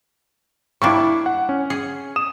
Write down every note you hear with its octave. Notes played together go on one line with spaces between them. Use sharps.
G3 A#3 D4 E4 C#6
F#5
C#4
G#4
D#6 E7